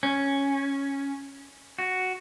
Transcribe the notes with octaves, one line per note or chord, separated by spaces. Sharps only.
C#4
F#4